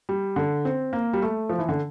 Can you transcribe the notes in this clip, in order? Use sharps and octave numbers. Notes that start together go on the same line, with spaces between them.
G3
D3
C4
A#3
G3
A3
F3
E3
D3